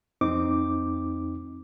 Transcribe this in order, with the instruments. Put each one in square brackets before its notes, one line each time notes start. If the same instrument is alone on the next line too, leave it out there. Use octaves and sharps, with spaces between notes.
[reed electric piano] F2 C4 D#4 D6